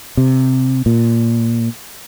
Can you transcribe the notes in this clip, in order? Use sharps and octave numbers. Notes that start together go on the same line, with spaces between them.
C3
A#2